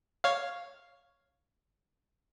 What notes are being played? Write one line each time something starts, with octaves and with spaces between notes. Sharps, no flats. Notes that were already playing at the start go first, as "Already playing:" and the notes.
C#5 F5